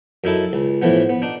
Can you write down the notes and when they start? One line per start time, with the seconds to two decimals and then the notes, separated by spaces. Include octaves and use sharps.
0.24 F#2 D#4 E4 A4
0.53 C#2
0.82 A2 E3 F3 B3
1.09 B3
1.22 D4 D#4